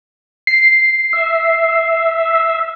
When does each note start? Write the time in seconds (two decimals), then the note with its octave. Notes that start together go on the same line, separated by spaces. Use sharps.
0.47 C7
1.13 E5